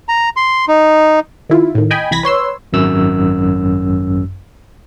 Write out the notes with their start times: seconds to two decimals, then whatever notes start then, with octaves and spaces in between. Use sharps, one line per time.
0.09 A#5
0.37 C6
0.68 D#4
1.49 D#3 E4 F4
1.75 A2 D#3
1.91 D#5 G5 G#5 B5
2.11 C2 E3 B5 G#6 A#6 B6
2.23 B4 C#5 C6 E6
2.73 G#1 F#2 E6